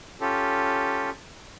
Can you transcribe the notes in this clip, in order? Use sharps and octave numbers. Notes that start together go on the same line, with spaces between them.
C#4 F4 G4 A4